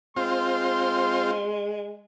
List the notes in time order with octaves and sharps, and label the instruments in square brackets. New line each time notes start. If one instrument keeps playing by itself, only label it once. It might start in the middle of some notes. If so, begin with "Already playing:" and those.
[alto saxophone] G#3 [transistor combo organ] C4 F4 [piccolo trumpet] C6